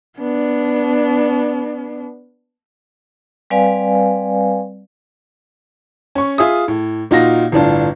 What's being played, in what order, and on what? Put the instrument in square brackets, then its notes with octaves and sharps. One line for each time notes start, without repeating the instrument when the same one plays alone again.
[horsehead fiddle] B3 D4
[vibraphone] G3 C4 B4 D5 F5 G#5
[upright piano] C#4 C#6
F4 G#4 E5 D#6
A2
A#2 D#4 F4 F#4 A#6
G1 A2 D4 F4